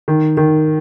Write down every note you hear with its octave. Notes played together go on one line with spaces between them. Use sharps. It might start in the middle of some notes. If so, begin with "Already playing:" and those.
D#3
D#3